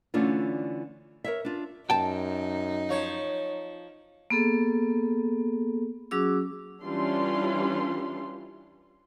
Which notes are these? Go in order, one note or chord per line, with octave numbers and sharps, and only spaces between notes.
D3 E3 A3 C#4 D4 F4
A#4 C#5 E5
D4 F4
F#2 D#4 G5 A5
F3 C#5
A#3 B3 G#4 A4
F#3 C#4 F#4 G#4 D6 E6
E3 G3 C#4 D4 F4 C6